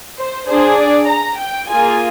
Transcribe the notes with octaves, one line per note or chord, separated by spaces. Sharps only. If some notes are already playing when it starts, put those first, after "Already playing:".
C5
D4 G#4 C5
D5
A#5
G5
A#3 F4 G#4 G#5